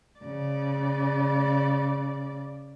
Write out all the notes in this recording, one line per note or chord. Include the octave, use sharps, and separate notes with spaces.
C#3 D5